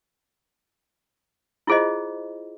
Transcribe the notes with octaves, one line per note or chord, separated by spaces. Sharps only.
E4 F4 G#4 C5 D#5